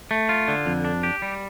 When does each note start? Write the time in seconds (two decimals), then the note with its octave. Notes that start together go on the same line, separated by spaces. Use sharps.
0.11 A3
0.29 F4
0.48 D3
0.66 F2
0.85 D4
1.03 G4
1.22 G3